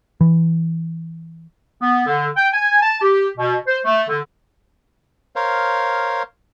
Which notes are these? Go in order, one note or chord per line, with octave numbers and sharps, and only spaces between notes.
E3
B3
D3
G5
G#5
A5
G4
B2
C5
A3
D3
A#4 C5 C#5 F5